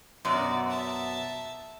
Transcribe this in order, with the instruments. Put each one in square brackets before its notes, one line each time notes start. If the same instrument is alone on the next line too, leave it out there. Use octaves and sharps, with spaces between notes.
[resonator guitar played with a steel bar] F#2 B2 [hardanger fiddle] F#4 D5
[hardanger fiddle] E5 A5